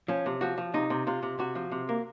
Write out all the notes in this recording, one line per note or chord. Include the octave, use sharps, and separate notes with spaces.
F3 C#4
C3
F3 F#4
F3
C3 D#4
C3
C3 F4
C3
C3 F#4
F3
C3
A#3